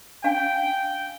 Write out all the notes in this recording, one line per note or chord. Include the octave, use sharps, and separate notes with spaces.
D4 F5 G5 G#5